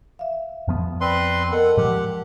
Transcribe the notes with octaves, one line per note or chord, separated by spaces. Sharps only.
E5 F5
F2 F3 B3
C4 B4 D5 C6
A4 A#4 D#5 F#5
G#2 F3 G4 F#5